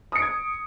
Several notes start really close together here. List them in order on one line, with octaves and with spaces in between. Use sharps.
D#6 C#7 D7 G#6